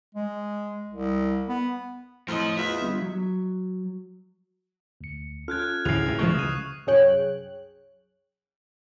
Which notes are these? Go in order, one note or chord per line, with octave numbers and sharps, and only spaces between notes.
G#3
C2
B3
F2 A2 F3 C5 D#5 C6
E2 F4 E5
G1
F#3
D2 C#7
C#4 F4 A4 F6 F#6 G#6
D2 A2 C#4 E4 G#4 C7 F7
C#2 A2
E3 G#3 A3 C#6
C#2 C#3 D#6 D#7
C2 F#2 G#4 C#5 G5 F#6